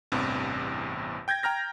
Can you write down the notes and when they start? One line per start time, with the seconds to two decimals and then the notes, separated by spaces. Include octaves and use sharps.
0.12 A1 E2 G2 C3
1.28 G5 G6 G#6 A#6
1.43 G5 A#5 F6 A#6